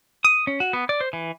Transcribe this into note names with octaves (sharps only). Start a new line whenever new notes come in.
D#6
C#4
F#4
B3
D5
C5
E3